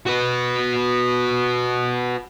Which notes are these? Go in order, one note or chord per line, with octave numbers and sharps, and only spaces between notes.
F#4 B4